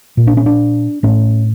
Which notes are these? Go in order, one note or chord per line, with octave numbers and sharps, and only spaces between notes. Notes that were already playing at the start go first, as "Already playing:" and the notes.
A#2
D4
C#4
D4
A2 C#4